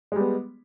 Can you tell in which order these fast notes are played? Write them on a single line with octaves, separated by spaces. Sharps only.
G#3 G3 B3